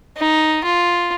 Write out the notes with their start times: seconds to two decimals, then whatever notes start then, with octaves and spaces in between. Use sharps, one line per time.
0.17 D#4
0.64 F4